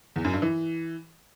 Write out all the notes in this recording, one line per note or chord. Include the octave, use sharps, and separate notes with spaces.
E2
F#2
G2
E3